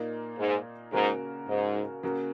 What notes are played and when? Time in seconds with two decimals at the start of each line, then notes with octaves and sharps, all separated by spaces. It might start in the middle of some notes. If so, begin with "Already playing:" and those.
Already playing: A#2 A#3 D#4
0.39 G#2
0.93 G#2 C#3 A#3 F#4 A#4
1.48 G#2
2.03 C#3 A#3 F#4 A#4